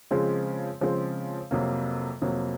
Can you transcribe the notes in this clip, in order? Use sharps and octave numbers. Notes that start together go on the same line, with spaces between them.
C#3 F3 G#3 C4
C#3 F3 G#3 C4
F2 C3 F#3 A#3
F2 C3 F#3 A#3